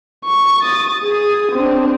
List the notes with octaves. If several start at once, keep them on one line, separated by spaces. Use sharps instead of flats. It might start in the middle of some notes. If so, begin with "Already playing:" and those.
C#6
D#6 A6
G#4 D#6
C4 D4